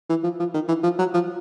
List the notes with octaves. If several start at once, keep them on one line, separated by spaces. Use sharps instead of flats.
E3
F3
F3
D#3
E3
F3
F#3
F3